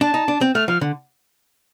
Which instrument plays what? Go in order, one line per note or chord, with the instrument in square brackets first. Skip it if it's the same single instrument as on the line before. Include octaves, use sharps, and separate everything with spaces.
[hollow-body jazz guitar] D4 [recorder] A5
[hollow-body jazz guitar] D#4
D4
C4
[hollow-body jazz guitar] A3 [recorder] F6
[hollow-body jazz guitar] F3 [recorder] F6
[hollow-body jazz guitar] D3